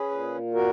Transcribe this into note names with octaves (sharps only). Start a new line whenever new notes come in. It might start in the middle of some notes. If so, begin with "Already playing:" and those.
Already playing: C#4 G#4 B4
A#2
F#4 A#4